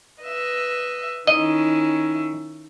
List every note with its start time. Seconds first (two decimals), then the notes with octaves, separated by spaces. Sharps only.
0.22 B4 D#5 E5
1.27 D#3 C#4 E4 D#5